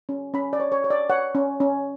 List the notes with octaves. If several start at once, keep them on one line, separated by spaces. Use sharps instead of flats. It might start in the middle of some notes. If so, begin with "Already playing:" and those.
C#4
C#4 B5
D5
C#5
C#5
C#5
D5
C#5 F#5
C#4
C#4